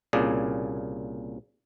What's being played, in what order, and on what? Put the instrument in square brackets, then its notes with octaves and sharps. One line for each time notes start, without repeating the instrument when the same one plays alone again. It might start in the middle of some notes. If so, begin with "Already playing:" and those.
[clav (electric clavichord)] C2 A#2 C#3 G#4 D5